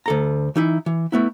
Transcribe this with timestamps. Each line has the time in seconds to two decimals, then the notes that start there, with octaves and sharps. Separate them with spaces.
0.06 D2 A4 A#5
0.56 E3 D#4 E4
0.86 E3
1.12 A3 B3 E4